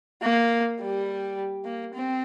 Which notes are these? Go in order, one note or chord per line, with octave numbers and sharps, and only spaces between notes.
A#3
G3
A#3
C4